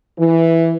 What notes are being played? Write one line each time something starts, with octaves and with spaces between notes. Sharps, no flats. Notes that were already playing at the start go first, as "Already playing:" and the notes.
E3